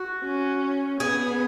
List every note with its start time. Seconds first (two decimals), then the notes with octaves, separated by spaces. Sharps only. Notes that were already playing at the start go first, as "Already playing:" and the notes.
Already playing: F#4
0.24 C#4
1.00 B3 G#4